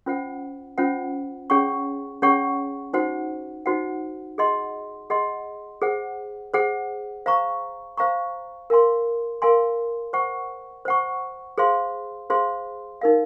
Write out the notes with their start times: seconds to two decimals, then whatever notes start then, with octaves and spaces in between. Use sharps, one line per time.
0.06 C#4 F4 C5 F#5
0.78 C#4 F4 C5 F#5
1.50 C#4 G#4 C#5 F#5 C#6
2.22 C#4 G#4 C#5 F#5 C#6
2.93 D#4 F#4 C5 F#5
3.66 D#4 F#4 C5 F#5
4.38 G#4 D#5 F#5 C6
5.10 G#4 D#5 F#5 C6
5.81 G#4 C5 F#5
6.54 G#4 C5 F#5
7.26 C5 F5 A#5 C#6
7.97 C5 F5 A#5 C#6
8.70 A#4 F5 G#5 C6
9.42 A#4 F5 G#5 C6
10.13 C5 F#5 C#6
10.85 C5 F#5 C#6
11.58 G#4 C5 F5 C6
12.30 G#4 C5 F5 C6
13.01 D#4 A#4 F5